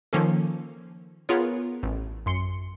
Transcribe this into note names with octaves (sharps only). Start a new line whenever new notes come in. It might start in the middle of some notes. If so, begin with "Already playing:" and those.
D#3 F3 A#3 C#4 A4
B3 F4 G#4 A#4 C#5
A1
F#2 C6 C#7